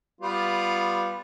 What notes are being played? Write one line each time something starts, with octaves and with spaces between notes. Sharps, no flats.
G3 B3 F4